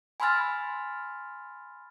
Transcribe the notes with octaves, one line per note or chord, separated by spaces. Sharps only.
G#5 B5 C6 E6 F6 A6